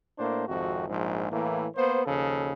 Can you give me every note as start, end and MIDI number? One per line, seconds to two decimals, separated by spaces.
0.19 0.48 45
0.19 0.48 58
0.19 0.48 62
0.19 0.48 72
0.48 0.85 32
0.48 0.85 41
0.48 0.85 48
0.48 0.85 66
0.88 1.26 34
0.88 1.26 44
0.88 1.26 53
1.31 1.66 45
1.31 1.66 52
1.31 1.66 58
1.75 2.01 58
1.75 2.01 59
1.75 2.01 72
2.05 2.52 39
2.05 2.52 49
2.05 2.52 53
2.05 2.52 69